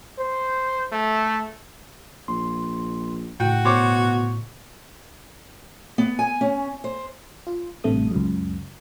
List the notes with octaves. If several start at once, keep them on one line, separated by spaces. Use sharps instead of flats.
C5
A3
A#1 C6
A2 C#3 F#4 G5
B2 C5 C#5 D6
B3
G#5
C#4
C5
F4
A1 G2 C3 A3 D#6
C#2 F#2